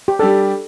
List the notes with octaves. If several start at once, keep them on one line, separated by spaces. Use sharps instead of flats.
G4
G3 D4 G4 A4 D5